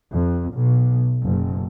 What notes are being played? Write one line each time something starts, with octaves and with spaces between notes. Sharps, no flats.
F2
B1
F#1